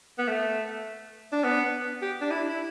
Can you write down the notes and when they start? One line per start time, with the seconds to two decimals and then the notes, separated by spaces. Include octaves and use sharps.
0.18 B3
0.28 A3
1.32 D4
1.44 B3
2.02 G4
2.21 D4
2.31 E4
2.49 E4